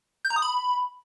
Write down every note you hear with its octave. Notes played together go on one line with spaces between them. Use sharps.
G6
A#5
D#6
B5